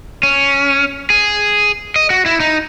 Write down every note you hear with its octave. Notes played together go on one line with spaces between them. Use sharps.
C#4
G#4
D#5
F#4
E4
D#4